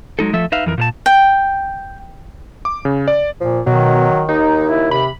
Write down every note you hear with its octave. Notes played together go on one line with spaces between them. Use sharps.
F#3 G#3 D#4 A4
F3 A3 A4 E5
D#4 B4 E5 F5
F2 E3 A#4
A#2 A#4 A5
G5
D6
C#3
D5
A#2 F3
B2 D#3 F#3
D#2 D#4
E4
C3 B5